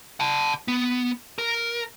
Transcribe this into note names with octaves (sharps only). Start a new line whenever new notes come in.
F#5 A5
B3
A#4